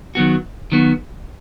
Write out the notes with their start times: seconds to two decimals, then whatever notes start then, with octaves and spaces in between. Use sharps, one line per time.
0.15 D#3 F#3 B3 F#4
0.72 D#3 F#3 B3 F#4